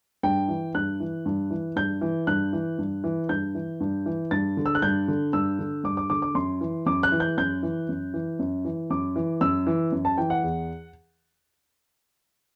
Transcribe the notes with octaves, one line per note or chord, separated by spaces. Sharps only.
G2 G5
E3
G2 F#6
E3
G2
E3
G2 G6
E3
G2 F#6
E3
G2
E3
G2 G6
E3
G2
E3
G2 A6
D3
E6
F#6
G2 G6
D3
G2 E6
D3
G2 D6
D6
D3 D6
D6
F#2 C6
E3
F#2 D6
F#6
E3
G6
F#2 G6
E3
F#2
E3
F#2
E3
F#2 D6
E3
F#2 E6
E3
F#2
A5
E3 G5
F#5
E2